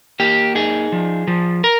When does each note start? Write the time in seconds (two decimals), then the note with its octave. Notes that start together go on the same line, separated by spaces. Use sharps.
0.20 A#3 G4
0.55 D#4 G#4
0.92 F3
1.28 F3
1.64 A#4